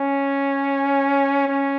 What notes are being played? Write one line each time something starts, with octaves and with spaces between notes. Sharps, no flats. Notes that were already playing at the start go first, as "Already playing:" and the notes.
Already playing: C#4
C#4